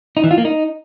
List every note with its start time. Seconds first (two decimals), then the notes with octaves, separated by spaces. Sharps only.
0.17 D#4
0.24 E3
0.31 F4
0.38 A#3
0.45 D#4